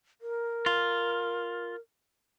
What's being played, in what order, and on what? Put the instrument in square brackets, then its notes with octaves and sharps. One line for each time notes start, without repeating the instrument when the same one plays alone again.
[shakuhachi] A#4
[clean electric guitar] F4